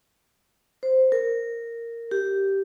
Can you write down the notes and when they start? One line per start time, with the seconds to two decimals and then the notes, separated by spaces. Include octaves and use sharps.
0.83 C5
1.12 A#4
2.11 G4